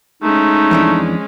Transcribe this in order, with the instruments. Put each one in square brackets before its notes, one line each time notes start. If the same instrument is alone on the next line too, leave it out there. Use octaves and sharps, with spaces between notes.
[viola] G#3 C#4 [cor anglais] A3 [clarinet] D#4
[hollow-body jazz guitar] F2 E3 D4